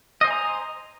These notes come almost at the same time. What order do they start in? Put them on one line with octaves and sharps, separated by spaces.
D#5 C5 G#5 A#5